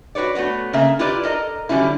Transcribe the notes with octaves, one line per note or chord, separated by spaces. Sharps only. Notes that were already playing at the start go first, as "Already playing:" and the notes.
F#4 G4 B4 C#5 D5
A3 B3 F#4 C#5
C#3 A#3 C#4 E5
E4 F4 G4 B4 D5
A4 A#4 D#5 A#5
D3 F#3 G3 C#4 E4